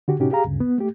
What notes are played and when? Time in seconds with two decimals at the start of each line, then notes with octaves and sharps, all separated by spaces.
0.08 D3 F#4 G4
0.20 A2 C3 C#4 D#4 F#4 G4
0.31 G4 G#4 F5 A#5
0.45 D2 G2 C#3
0.60 B3
0.78 A3 G4